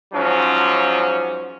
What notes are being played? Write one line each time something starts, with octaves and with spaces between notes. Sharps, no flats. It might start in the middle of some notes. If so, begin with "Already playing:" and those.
G#2 F3 F#3 C#4